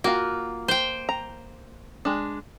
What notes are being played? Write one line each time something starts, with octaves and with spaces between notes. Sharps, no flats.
A#3 F4 F#4
C5 G5
A#5
G#3 D4